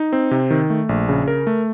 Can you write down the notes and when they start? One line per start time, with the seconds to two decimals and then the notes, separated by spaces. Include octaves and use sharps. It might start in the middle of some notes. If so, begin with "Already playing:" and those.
Already playing: D#4
0.13 C4
0.31 C3
0.50 D#3
0.70 A3
0.89 A#1
1.09 C#3
1.28 A#4
1.47 A3